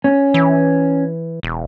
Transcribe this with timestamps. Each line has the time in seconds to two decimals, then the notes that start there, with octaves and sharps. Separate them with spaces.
0.04 C#4
0.34 E3
1.43 E1